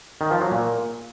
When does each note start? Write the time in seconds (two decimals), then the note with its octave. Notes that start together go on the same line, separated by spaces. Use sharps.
0.21 D#3
0.31 F3
0.41 F#3
0.51 A#2